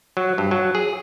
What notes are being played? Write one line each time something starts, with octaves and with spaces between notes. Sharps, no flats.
F#3
G2
F#3
G#4